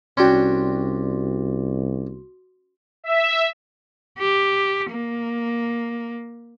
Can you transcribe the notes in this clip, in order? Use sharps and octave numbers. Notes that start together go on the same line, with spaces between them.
C2 C#4 D4 F#4 G5 C6
E5
G4
A#3